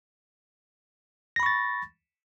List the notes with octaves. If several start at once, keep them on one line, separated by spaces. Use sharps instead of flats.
B5 C#6 A6 A#6